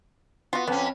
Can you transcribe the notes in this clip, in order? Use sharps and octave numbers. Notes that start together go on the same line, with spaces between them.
B3 F4 F#4
F2 B3 C#4